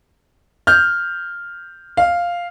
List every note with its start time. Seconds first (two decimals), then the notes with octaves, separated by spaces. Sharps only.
0.67 F6 G6
1.97 F5